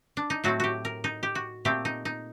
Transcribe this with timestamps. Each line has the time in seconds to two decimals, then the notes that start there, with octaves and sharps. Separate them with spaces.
0.17 D4
0.30 D#4
0.44 A2 F#3 A3 C4 F#4
0.60 F#4 G4
0.85 A#4
1.04 D#4
1.23 G4
1.35 F#4
1.65 A#2 A3 C4 G4
1.85 D#4
2.05 D#4